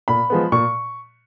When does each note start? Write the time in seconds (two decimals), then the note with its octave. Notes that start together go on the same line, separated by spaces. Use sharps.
0.08 A#2 B5
0.30 F3 G#3 B3
0.52 A#2 C#6